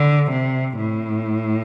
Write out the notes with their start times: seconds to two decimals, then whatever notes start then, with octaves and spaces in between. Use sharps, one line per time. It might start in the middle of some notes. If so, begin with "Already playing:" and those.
Already playing: D3
0.30 C3
0.78 A2